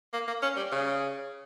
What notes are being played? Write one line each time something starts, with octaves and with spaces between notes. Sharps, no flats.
A#3
A#3
C#4
G3
C#3